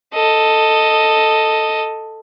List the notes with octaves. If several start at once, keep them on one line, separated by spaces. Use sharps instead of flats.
A4 D#5